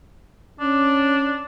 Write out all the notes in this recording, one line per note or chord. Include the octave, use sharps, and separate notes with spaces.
C#4 D4